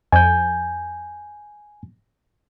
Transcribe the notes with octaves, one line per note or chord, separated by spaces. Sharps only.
F2 G#5 G6